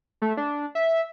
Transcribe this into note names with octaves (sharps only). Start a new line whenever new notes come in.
A3
D4
E5